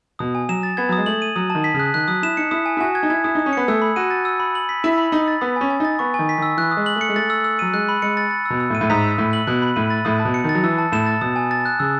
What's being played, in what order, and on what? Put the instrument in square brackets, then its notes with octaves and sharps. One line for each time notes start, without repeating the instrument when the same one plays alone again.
[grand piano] B2 [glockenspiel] D#6
[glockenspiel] G#5
[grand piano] F#3 [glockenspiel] E7
[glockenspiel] A6
[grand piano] B3 [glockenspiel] G#6
[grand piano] F#3 [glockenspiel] D#6
[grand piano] G#3
[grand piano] A3 [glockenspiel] F#7
[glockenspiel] D#7
[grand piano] F#3 [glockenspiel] D#6
[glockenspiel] A5
[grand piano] D#3
[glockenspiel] B6
[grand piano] C#3
[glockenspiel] F#6
[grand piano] D#3 [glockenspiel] F#6
[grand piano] F#3 [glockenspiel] D#6
[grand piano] E4 [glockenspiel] E7
[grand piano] D#4 [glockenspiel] C#7
[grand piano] E4 [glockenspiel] D#6
[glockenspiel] G#5
[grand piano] E4
[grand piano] F#4 [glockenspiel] G#5
[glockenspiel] G#6
[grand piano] D#4
[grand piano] E4 [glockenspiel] G#6
[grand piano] E4 [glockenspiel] D#6
[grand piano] D#4 [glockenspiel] D#6
[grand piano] C#4
[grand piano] B3 [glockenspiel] C#7
[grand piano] A3 [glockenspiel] E6
[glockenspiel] B5
[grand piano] F#4 [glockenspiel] D#7
[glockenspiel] A6
E6
B5
F#7
B6
[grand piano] E4 [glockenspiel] E6
[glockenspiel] B5
[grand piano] D#4 [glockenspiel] B5
[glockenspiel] A6
[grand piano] B3 [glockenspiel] D#6
[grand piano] C#4 [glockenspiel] G#5
[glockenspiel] G#5
[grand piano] D#4 [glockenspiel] A6
[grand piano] B3 [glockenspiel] C#6
[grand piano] D#3 [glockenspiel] G#5
[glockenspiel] B6
[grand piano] D#3 [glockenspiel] E6
[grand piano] E3 [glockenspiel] F#6
[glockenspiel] D#6
[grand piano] G#3
[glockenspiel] F#7
[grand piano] A3 [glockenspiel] C#7
[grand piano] G#3
[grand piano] A3 [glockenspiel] A6
[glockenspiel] E6
E6
[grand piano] F#3 [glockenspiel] D#7
[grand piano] G#3 [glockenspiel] F#6
[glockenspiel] B5
[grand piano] G#3 [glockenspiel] C#7
[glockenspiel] A6
A6
[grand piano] B2 [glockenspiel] E6
[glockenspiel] E6
[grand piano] A2
[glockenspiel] D#7
[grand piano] A2
[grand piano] G#2 [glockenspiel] B6
[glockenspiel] E6
[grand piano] A2 [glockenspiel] E6
[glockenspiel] F#7
[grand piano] B2 [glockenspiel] F#6
[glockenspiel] B5
[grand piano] A2 [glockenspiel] D#7
[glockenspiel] A6
[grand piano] A2 [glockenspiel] D#6
[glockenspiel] A5
[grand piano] B2
[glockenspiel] C#7
[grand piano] D#3
[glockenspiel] A6
[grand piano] F#3
[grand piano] E3 [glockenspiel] E6
[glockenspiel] A5
[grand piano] A2 [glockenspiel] E7
[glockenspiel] A6
[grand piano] B2 [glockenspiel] D#6
[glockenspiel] G#5
A6
F#6
[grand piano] C#3 [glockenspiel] E6